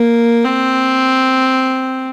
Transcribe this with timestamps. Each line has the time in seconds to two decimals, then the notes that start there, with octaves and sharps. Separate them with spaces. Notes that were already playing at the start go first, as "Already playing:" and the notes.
Already playing: A#3
0.45 C4